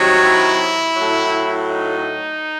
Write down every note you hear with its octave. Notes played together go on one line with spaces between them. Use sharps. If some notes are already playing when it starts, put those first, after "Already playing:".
Already playing: C3 D#3 F#3
E4
A2 F#3
D#4